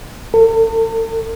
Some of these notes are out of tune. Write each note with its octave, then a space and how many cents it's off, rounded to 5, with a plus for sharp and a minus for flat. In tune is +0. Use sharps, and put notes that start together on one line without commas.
A4 +45